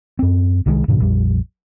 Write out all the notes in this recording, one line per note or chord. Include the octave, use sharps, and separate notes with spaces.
F#2 C4
C2 D#3 E3 G#3
G2 A#2 C#3 F3
A#1 F2 G3